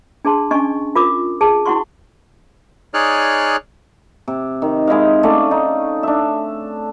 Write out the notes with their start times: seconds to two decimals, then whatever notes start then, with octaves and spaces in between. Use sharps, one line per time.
0.25 D4 G#4 A5 C6
0.51 C#4 D4 D#5 G#5 C#6
0.95 F4 A#4 D6 D#6
1.41 G#4 A5
1.66 E4 F#4 F#5 C6 C#6
2.94 D#4 G#4 C#5 D5 F6 F#6
4.28 C3
4.62 D#3
4.87 G#3 E4 D#5 F5
5.23 A3 C#4 D5 F5
5.51 D#4
6.03 D4 E5